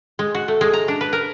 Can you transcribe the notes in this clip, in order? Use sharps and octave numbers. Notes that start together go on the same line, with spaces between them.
G#3
F#4
A3
G#3
A#5
D4
B4
A#4